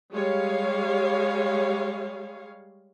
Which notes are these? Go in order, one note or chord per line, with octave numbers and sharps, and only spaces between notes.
G3 G#3 C#5 F5